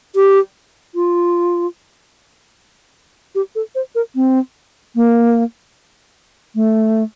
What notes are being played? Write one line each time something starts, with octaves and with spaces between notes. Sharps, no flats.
G4
F4
G4
A4
C5
A#4
C4
A#3
A3